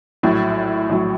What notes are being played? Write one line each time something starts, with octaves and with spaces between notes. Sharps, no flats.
A#1 A2 F#3
A#1 A2 F#3